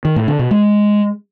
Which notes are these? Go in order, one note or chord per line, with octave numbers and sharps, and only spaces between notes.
D#3
A2
D3
B2
G#3